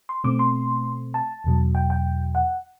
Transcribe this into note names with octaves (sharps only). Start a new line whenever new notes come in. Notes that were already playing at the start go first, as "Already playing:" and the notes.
C6
B2 A3 C4 D6
C6
A5
E2 B2 F#3
G5
G5
F#5